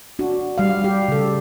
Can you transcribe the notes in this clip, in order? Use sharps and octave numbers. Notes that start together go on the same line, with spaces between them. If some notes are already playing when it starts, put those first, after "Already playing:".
D4 F#4
G3 F5
G4
C#3 A4